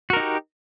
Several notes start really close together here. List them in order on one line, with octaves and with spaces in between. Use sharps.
F#4 A#4 D#4 G4